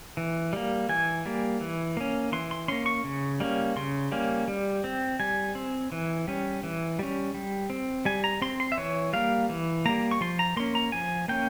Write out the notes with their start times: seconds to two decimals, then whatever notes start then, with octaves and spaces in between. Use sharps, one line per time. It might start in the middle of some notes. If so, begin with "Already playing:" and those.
0.17 E3
0.53 G3 A#3
0.89 E3 G#5
1.26 G3 A#3
1.61 E3
1.97 A#3 C#4
2.32 E3 C6
2.51 C6
2.68 A#3 C#4 C6
2.86 C#6
3.04 C#3
3.40 G3 A#3 C#4
3.76 C#3 C6
4.12 G3 A#3 C#4
4.48 G3
4.84 C4
5.20 G3 G#5
5.55 C4
5.92 E3
6.28 G3 C#4
6.63 E3
6.99 G3 C#4
7.34 G3
7.70 C4
8.05 G3 G#5
8.24 A#5
8.42 C4 C6
8.60 C6
8.72 E5
8.78 E3 C#5
9.13 G3 A#3 F5
9.49 E3
9.85 G3 A#3 A#5
10.11 C#6
10.21 F3 C6
10.39 A#5
10.57 A#3 C#4 C6
10.75 A#5
10.92 F3 G#5
11.28 A#3 C#4 G5